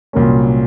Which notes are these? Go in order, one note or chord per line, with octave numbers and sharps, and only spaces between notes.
C2 A#2 F#3 A#3 C#4